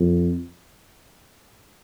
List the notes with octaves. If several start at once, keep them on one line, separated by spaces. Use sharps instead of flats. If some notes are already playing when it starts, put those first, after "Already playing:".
Already playing: F2